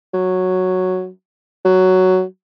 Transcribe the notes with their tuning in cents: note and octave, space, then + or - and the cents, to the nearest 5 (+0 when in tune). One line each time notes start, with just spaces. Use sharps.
F#3 -5
F#3 +5